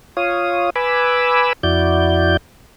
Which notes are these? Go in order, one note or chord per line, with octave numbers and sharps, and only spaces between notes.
F4 C#5 F5 D#6
B4 G#5 B5 D6 E6
F2 E4 F#4 D5 G6